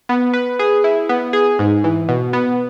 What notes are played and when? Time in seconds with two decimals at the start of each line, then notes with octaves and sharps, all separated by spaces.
0.09 B3
0.33 B4
0.59 G#4
0.84 E4
1.09 B3
1.33 G#4
1.59 G#2
1.84 E3
2.09 B2
2.33 B3